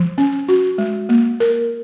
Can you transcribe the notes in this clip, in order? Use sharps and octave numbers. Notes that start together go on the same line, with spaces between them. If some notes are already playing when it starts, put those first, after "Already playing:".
Already playing: F3
C#4
F#4
G#3
A#3
A#4